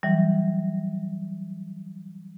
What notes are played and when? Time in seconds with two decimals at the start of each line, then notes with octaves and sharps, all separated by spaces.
0.03 E3 F#3 G3